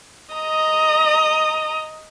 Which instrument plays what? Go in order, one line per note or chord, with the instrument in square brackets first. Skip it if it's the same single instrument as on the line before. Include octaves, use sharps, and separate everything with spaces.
[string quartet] D#5 A#5 D#6